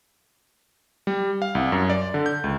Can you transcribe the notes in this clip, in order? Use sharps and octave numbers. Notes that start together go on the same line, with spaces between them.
G3
F5
C2
F#2
D5
D3
G6
C#2